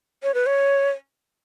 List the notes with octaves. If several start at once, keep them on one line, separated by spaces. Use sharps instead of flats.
C#5
B4
C#5